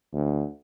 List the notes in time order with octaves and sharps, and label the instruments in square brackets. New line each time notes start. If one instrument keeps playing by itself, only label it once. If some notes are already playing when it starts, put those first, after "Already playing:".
[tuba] D2